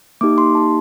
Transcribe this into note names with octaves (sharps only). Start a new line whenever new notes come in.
A#3 D#4 G4 D6
C6
A5